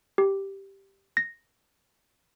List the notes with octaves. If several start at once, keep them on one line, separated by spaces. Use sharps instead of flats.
G4
A#6